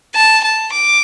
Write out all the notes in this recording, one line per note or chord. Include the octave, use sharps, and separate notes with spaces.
A5
A5
D6